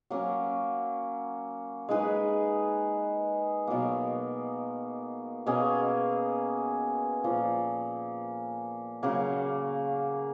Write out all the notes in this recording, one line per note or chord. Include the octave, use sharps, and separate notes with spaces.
F#3 A#3 C#4
G#3 D#4 G#4 B4
B2 F#3 A#3
B2 A#3 C#4 G#4
A#2 F3 A#3
C#3 F#3 A#3